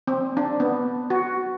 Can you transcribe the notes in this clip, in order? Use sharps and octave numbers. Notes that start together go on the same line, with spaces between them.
C4
D4
B3
F#4